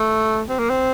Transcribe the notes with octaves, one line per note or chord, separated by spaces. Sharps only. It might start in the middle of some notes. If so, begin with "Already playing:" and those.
Already playing: A3
C4
A#3
C4